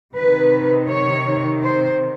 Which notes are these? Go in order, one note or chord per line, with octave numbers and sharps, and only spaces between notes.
C3 D#3 B4
C#5
C5